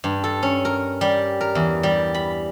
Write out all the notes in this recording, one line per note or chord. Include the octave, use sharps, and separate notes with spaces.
G2
A4
C#4
A#4
G3
A#4
E2
G3
B5